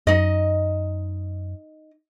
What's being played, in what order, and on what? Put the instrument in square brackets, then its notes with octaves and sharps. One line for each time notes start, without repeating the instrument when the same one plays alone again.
[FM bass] F#2 [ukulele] D#4 D#5